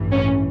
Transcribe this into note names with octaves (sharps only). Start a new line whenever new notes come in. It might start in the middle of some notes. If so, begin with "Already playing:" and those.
Already playing: A1 G2 E3
C#4